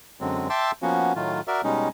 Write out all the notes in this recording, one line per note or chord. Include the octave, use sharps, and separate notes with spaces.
F#2 D3 F#3 G#3 C4
E5 G5 A5 C6 D6 E6
F3 A#3 B3 C#4 F#4
A2 D#3 F#3 A3 F4
F#4 A#4 D5 E5
B2 G3 G#3 C#4 D#4